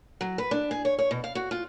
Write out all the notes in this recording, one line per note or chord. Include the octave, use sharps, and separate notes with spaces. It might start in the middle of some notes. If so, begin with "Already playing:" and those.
F#3
B4
D4
G#4
C#5
C#5
B2
F5
F#4
F4